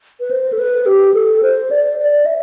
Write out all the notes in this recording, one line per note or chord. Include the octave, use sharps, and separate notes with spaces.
B4
C5
A4
B4
G4
A4
C5
D5
D5
E5